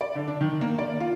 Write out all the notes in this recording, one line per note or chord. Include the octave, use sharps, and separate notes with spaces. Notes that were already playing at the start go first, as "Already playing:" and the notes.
D5
D3
D4
D#3
A#3
D5
F4